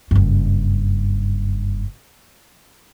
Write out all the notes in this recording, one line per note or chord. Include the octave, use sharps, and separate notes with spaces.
F#1 G2